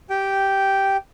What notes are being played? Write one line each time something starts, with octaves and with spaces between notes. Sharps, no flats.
G4 G5